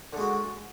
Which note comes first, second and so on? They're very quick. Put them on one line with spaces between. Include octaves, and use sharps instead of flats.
D3 G#3 F#4